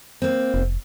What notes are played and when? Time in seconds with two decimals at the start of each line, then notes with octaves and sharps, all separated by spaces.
0.22 A#3 C4
0.54 F1